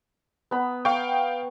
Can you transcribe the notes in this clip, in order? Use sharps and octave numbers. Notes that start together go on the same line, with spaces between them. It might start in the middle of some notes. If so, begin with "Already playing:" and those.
B3 B5
F5 G5 C#6